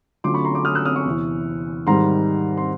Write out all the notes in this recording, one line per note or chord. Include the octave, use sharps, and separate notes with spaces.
D3 F#3 A3 C#4 F4 C6 D6
B5 C#6
A#5 C6
C6 D6
D#6 F6
E6 F#6
D#6 F6
C#6 D#6
E2 C3 E3
G#2 D#3 G3 A#5 C6
C6